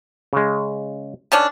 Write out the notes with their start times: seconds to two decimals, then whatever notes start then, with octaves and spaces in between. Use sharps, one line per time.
0.33 C#3 G#3
1.32 D#3 C#4 D4